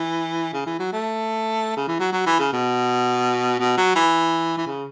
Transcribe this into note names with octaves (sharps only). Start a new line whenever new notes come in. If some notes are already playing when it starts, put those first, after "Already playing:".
Already playing: E3
C#3
E3
F#3
A3
C#3
E3
F#3
F#3
E3
C#3
B2
B2
F#3
E3
E3
C#3